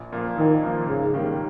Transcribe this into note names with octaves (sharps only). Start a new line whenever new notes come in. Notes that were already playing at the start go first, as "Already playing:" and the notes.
Already playing: A#1
A#2 F3 A#3
A#1 D#3
A#2 F3 A#3
G#2 C#3
D#3 G3 A#3 C#4